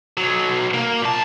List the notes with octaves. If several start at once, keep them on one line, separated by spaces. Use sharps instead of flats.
B1 F#3
A#3
A#2 A5